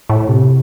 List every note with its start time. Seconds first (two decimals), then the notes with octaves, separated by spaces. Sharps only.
0.10 A2
0.29 C3